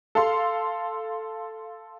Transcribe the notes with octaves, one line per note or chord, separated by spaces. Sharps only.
A4 F5 C6